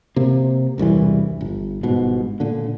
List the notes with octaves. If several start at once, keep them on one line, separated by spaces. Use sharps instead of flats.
C3 A#3
E1 C2 G2 E3
G1
G1 G#2 B2
A#2 D3